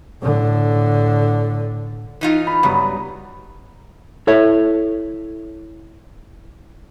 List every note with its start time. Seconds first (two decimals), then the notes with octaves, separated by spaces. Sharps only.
0.22 A2 D3
2.21 E3 D#4 F4
2.47 B5
2.63 G2 C#3 F#3 B3
4.27 E4 A4 C#5 E5